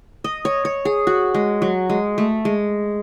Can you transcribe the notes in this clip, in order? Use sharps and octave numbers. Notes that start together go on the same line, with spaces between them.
D#5
C#5
C#5
G#4
F#4
G#3
F#3
G#3
A3
G#3